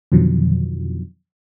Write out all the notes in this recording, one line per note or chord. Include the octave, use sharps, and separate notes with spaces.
F2 B2 D3 D#3 F3 F#3